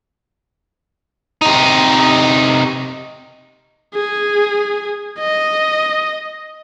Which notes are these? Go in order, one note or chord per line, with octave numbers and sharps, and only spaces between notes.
C3 D#4
G#4
D#5